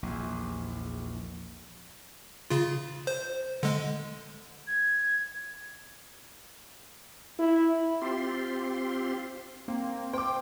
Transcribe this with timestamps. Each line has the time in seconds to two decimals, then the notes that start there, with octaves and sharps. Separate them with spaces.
0.03 A#1 E2
2.50 C#3 F4
3.07 C5
3.63 D3 G#3
4.67 G#6
7.39 E4
8.02 C4 F4 G4 C6
9.68 A#3 C4
10.13 C5 G5 D6